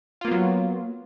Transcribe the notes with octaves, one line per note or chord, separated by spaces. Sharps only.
F#3 A#3 B3 F4